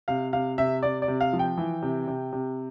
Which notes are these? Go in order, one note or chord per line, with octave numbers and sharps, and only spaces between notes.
C3 F5
C3 F5
C3 E5
C3 D5
D5
C3
F5
F3
G5
E3
C3
C3
C3